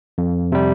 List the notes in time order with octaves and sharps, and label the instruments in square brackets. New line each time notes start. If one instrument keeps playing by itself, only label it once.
[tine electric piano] F2
C3 G3